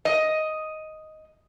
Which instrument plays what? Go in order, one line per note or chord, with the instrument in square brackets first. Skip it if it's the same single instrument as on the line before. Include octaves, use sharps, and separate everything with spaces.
[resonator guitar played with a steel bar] D#5